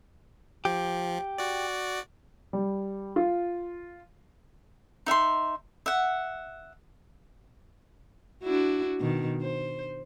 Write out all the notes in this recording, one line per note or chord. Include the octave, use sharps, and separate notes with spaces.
F3 G4
F#4 D5
G3
F4
D#4 E5 F#5 C6
E5 F#5
D4 E4 F#4
B2 D#3
C5